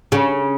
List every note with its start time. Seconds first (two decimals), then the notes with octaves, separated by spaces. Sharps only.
0.12 C#3